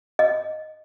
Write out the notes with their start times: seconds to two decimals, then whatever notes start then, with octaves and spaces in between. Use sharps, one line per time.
0.19 D#5